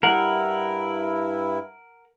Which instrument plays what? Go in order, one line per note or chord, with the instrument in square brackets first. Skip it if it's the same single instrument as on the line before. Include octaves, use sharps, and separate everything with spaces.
[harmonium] G2 E4 [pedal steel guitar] A#4 F#5